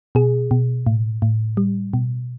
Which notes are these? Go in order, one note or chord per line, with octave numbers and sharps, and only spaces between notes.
B2 G#4
B2
A2
A2
G3
B2